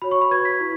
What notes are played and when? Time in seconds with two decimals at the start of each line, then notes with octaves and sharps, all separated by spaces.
0.02 F#4 C#5 B5
0.11 C#6
0.22 B5
0.31 F#4 B4 G#6
0.45 B6
0.60 E4